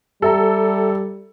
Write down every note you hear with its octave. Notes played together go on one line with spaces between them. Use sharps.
G3 G4 A4 E5 A#5